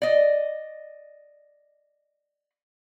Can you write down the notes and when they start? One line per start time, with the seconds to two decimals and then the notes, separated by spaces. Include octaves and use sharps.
0.02 D5 D#5